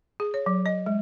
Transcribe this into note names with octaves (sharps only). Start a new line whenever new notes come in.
G#4
C#5
F#3
D#5
G#3